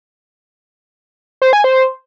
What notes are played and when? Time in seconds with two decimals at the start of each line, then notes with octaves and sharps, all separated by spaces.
1.42 C5
1.53 G#5
1.64 C5